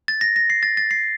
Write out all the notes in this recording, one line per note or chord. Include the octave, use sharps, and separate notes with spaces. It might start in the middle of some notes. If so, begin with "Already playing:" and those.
A6
A#6
A#6
C7
A6
A6
C7